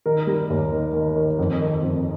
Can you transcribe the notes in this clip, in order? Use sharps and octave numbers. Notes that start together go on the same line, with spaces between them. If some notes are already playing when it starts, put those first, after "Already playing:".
D#3 A#4
G3
D#2
D#3
D#3
D#3
F2
D#3
F2